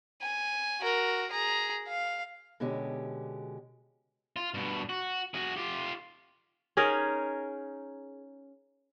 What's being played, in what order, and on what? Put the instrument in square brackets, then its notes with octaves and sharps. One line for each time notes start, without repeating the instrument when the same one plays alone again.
[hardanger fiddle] G#5
F#4 A#4
G#4 A#5
F5
[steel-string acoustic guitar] B2 D3 G#3 C#4 G4
[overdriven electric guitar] F4
G2 B2
F#4
F#4 G#4
F4 G4
[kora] C#4 D#4 G#4 A#4